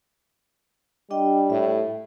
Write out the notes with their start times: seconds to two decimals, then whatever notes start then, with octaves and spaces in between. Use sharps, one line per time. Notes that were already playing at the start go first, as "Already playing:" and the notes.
1.11 G3 D4 D#5 G5
1.50 A2 E5